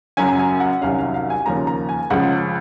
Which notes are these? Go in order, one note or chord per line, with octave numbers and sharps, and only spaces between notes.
F#2 C#3 F#3 C#4 G#5
A#5
G#5
F#5
C2 C3 D#3 F#3 C#4 F5
F5
F5
G#5
D#2 C#3 F3 A#3 C#4 A#5
A#5
G#5
C#2 C#3 F3 F#5